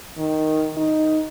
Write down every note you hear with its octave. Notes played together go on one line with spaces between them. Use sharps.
D#3
D#4